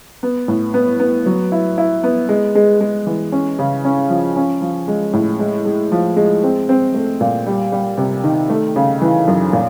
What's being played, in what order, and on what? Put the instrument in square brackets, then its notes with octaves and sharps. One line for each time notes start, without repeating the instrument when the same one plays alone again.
[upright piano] B3
A2
B3
B3
F#3
E4
E4
B3
G#3
G#3
G#3
E3
C#4
C#3
C#4
F3
C#4
F3
G#3
A2
G#3
G#3
F3
G#3
C4
C4
A3
A#2
G3
G3
C3
D#3
A3
C#3
E3
F#2
A#2